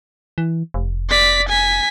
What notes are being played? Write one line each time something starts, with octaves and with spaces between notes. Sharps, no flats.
E3
F1
D5 B6
G#5 B6